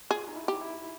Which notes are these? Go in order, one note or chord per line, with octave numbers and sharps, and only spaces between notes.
F4 G#4
D#4
E4
G4
E4